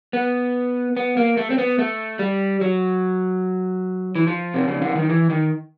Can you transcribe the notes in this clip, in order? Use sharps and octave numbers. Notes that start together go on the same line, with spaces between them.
B3
B3
A#3
A3
C4
B3
A3
G3
F#3
E3
F3
C3
C#3
D3
D#3
E3
D#3